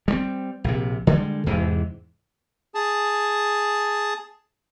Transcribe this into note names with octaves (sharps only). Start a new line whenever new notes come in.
G3 G#3 C4
A#1 C3
D3 G3 G#3
E2 G#2 C3 E3
G#4 A5